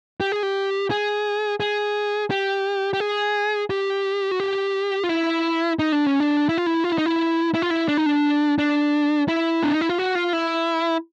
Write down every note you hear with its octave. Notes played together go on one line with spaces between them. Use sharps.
G4
G#4
G4
G#4
G#4
G4
G4
G#4
G4
F#4
G4
F4
E4
D#4
D4
C#4
D4
E4
F4
E4
F4
E4
D#4
E4
E4
F4
E4
D4
D#4
D4
D4
E4
D4
D#4
E4
F4
F#4
F4
E4